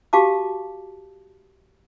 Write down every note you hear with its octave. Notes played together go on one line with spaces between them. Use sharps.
F#4 G4 F5 A5 D6